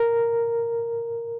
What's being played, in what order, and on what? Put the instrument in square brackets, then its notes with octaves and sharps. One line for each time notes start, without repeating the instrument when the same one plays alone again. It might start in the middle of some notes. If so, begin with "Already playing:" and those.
Already playing: [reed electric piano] A#4